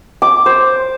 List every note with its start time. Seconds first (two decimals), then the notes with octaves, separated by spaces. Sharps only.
0.22 D6
0.46 C5